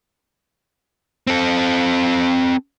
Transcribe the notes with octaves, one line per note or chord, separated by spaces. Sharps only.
C4 A4